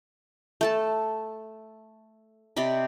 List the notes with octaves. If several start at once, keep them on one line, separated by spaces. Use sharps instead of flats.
A3 A4 A5
C3 D5 D#5 B5